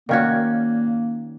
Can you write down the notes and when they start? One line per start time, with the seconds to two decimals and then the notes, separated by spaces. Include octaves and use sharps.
0.09 D#3 A#3 C#4 F#4 D5 F5 G#6